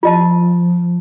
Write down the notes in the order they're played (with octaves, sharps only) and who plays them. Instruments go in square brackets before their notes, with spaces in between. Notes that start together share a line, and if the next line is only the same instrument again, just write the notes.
[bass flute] F3 [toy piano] F4 D#5 A5